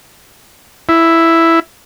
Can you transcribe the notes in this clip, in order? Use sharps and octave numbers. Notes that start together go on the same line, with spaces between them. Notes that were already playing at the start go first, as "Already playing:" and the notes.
E4